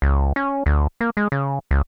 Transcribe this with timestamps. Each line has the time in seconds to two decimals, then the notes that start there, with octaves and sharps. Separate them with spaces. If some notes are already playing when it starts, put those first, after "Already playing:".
0.02 C#2
0.36 C#4
0.66 D2
1.01 A#3
1.17 G#3
1.32 C#3
1.71 C#2